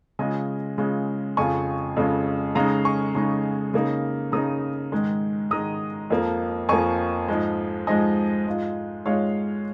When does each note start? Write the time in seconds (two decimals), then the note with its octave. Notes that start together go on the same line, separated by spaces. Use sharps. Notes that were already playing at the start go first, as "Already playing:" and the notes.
0.19 C#3 G#3 F4 D#5 G#5
0.78 C#3 G#3 F4
1.37 F2 C#3 G#3 F4 G#5 C#6
1.96 F2 C#3 G#3 F4
2.55 C#3 G#3 D#4 F5 A#5
2.85 G#5 C#6
3.15 C#3 G#3 D#4
3.74 C#3 A#3 D#4
4.32 C#3 A#3 D#4 A#5 D#6
4.92 G#2 D#3 G#3
5.51 G#2 D#3 G#3 A#5 D#6
6.10 F2 F3 A#3
6.69 F2 F3 A#3 G#5 C#6
7.28 G#2 F3 G#3
7.87 G#2 F3 G#3 D#5 G#5
8.47 G#2 G#3 F4
9.06 G#2 G#3 F4 C#5 F5